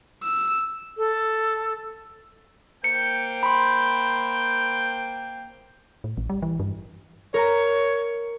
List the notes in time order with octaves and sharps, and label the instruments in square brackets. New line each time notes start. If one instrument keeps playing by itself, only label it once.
[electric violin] E6
[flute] A4
[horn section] A#3 C5 G5 [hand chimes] C#7
[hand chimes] B5 C6
[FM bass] A2
A1
G3
E3
G2
[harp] A#4 A#5 [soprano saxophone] C#5